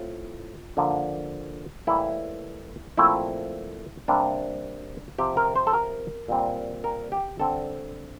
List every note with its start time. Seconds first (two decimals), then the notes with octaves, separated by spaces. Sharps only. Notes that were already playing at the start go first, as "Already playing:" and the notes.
Already playing: A2 C4 F4
0.77 D3 F3 A#3
1.87 A2 E3 G3 A#3 E4
2.98 A#2 F3 A3 C4 E4
4.08 C3 G3 A#3 D4
5.18 C3 F3 C4 G4
5.37 A#4
5.56 C5
5.67 A4
5.73 A#4
6.28 A#2 G3 C4
6.84 A#4
7.12 G4
7.39 D3 G3 C4 A4